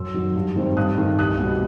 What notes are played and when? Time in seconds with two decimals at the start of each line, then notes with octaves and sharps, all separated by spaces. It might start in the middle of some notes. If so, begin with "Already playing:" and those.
Already playing: F#2 C6 E6
0.14 D#3 F#3
0.35 G2
0.56 D#3 G3 C4
0.77 G2 D#6 F#6
0.98 D#3 A3
1.19 C2 D#6 F#6
1.39 B2 G3 B3